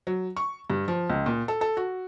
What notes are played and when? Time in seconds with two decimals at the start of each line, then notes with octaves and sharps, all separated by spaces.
0.07 F#3
0.37 C#6
0.70 G2
0.88 F3
1.10 C#2
1.26 A#2
1.48 A4
1.61 A4
1.77 F#4